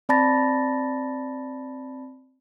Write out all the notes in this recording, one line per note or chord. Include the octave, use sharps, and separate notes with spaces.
C4 D5 A5 B5 A6 A#6